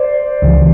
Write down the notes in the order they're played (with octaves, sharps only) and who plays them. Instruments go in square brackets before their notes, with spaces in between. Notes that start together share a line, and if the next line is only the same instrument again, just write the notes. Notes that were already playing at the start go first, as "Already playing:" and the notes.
Already playing: [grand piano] C5 D5
[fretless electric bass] C#2 C#3 E3